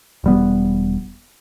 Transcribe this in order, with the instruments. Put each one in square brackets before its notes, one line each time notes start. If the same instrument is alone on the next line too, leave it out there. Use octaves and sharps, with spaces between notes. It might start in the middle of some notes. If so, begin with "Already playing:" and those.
[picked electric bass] E1 G3 B3